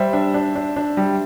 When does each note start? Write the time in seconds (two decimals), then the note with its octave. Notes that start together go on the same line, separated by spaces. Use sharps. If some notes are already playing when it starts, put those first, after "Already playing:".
Already playing: G3 C5 E5
0.13 D4
0.34 D4
0.56 D4
0.76 D4
0.97 G3